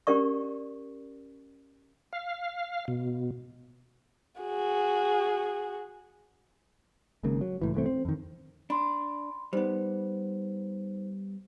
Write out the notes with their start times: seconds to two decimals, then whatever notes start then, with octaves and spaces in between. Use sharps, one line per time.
0.07 C#4 G4 A#4 D5 C#6
2.13 F5
2.88 B2
4.41 F#4 G#4
7.23 G#1 G#2 C#3 A#3
7.41 F#3
7.62 C#2 A2 E3
7.74 C2 E3 A3 C4
7.86 C4
8.05 F2 D#3
8.70 D4 B5 C6
9.53 G3 B3 D#4 C5